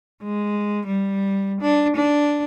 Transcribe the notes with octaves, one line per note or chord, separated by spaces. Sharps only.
G#3
G3
D4
D4